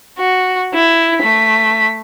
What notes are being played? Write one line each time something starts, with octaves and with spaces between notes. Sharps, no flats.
F#4
E4
A3 B6